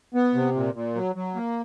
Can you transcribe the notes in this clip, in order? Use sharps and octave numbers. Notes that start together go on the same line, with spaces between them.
B3
C3
A#2
A#2
F#3
F#3
A#3